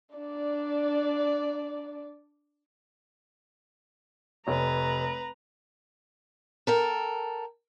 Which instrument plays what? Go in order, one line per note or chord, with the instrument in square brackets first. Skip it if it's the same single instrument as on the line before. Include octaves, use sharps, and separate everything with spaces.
[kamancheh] D4 D5
[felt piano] F1 C#5 [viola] B4 A#5
[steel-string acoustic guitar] A4 A#4 G5